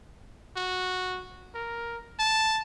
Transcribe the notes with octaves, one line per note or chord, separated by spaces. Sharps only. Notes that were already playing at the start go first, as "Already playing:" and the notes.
F#4
A#4
A5